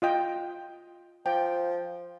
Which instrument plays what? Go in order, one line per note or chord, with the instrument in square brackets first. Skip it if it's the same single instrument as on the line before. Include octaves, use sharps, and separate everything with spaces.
[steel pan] F4 D#5 G5
[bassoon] F3 [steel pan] G5